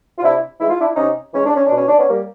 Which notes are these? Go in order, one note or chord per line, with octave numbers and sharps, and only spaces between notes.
F4
C3 D4 E4
E3 G#3 E4
F4
D4 E4
C3 C#4 D#4
E3 G#3 C#4
D4
C#4
B2 D4
C#4
D4
B3 C#4
G3 A#3